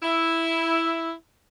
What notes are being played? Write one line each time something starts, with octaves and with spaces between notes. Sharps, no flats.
E4